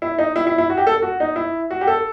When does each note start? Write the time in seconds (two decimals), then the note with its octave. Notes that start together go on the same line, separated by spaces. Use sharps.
0.02 E4
0.18 D#4
0.36 E4
0.47 E4
0.58 E4
0.70 F#4
0.77 G4
0.87 A4
1.02 F#4
1.20 D#4
1.36 E4
1.70 F#4
1.81 G4
1.87 A4